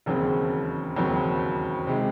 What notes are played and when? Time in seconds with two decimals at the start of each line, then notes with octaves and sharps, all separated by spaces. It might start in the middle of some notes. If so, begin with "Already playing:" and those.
0.06 E1 D#2 C#3 F#3 C4
0.96 E1 D#2 C#3 F#3 C4
1.87 C3 D#3 G#3